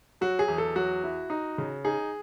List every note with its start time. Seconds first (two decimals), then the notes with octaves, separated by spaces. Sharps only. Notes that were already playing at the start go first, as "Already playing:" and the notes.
0.21 F#3 F#4
0.39 G#4
0.48 E2
0.58 A4
0.75 F#3 F#4
1.04 E4
1.30 D#4
1.58 C#3
1.85 D#4 G#4